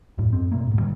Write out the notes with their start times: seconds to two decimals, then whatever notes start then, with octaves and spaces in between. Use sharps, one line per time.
0.18 F#2 A2
0.33 F#2 C4
0.52 B2 A3 A#3
0.67 D2 G#2
0.79 D3 G3